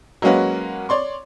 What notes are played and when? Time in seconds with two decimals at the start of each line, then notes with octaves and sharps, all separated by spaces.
0.22 F#3 G#3 A#3 C#4 F#4 B4
0.89 C#5 D5 C6 C#6